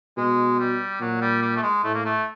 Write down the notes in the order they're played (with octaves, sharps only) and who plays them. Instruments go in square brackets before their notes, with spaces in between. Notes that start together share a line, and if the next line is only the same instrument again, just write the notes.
[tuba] B2 [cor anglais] G#3
[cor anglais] G3
[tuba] A#2 [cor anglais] F#3
[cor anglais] G3
G3
A3
G#3
[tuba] A2 [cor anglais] A3
[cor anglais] A#3
A3